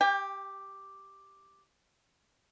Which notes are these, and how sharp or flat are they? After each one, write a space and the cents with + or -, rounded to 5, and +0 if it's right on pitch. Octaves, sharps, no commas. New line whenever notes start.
G4 +0 G5 +30